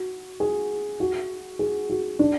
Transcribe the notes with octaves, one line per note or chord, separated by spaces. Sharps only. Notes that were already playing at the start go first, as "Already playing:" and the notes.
Already playing: F#4
G#4
F#4
G#4
F#4
D4